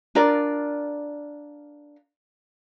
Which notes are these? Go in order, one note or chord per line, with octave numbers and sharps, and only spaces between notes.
D4 F4 A#4 D5